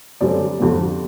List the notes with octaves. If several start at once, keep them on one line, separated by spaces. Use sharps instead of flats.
F#2 D3 G3 C4 D5
F2 D3 G3 B3